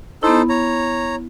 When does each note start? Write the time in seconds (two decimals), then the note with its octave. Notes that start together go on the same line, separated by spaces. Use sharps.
0.23 B3 D#4 E4 A4 C5
0.49 C#5 A#5